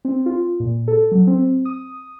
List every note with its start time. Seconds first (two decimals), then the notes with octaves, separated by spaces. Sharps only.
0.05 C4
0.26 F4
0.60 A#2
0.88 A4
1.12 F#3
1.27 C4
1.65 D#6